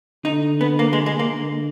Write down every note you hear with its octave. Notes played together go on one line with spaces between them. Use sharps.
D3 D#4
B3
A#3
G#3
G#3
A#3
D3